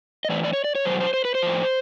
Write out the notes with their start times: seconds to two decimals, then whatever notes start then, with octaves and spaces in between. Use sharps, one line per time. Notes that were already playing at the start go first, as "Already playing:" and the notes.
0.25 D#5
0.29 A2 E3 D5
0.44 D5
0.53 C#5
0.64 D5
0.75 C#5
0.85 E2 B2 F#3 C5
1.00 C5
1.14 C5
1.25 B4
1.35 C5
1.42 A2 F3